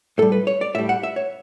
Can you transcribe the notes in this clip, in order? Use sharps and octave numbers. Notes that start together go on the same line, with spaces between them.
A2 G3 A4
B4
C#5
D5
A2 G3 E5
F#5
E5
C#5